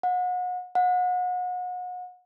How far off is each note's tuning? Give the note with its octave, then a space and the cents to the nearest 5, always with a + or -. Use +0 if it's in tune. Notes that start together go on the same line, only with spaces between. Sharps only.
F#5 -35
F#5 -35